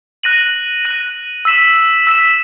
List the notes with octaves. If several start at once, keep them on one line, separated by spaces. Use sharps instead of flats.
F#6 A#6 D#7 F#7
F#6 A#6 D#7 F#7
E6 B6 E7
E6 B6 E7